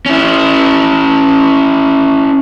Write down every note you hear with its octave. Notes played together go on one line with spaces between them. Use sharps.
C#4 E4